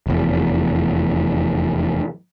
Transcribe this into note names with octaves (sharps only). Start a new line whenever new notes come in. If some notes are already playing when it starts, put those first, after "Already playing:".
F1 E2